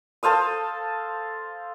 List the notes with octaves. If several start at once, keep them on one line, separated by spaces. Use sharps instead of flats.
A4 C5 F5 D#6